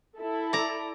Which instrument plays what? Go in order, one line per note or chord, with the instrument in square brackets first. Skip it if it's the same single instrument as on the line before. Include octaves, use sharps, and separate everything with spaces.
[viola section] E4 A4
[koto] D5 A#5